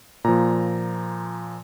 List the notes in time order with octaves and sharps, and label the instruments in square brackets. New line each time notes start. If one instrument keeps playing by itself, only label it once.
[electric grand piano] A#2 F3 A#5